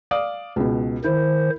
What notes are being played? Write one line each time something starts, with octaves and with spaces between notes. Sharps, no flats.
D5 F5 D#6
C#2 B2
D#3 E4 C5